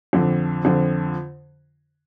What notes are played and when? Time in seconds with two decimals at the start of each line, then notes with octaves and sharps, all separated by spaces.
0.13 F2 D3 F3 C4
0.65 F2 D3 F3 C4